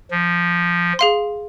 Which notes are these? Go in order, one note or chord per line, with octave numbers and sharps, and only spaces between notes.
F3
G#4 F5 C6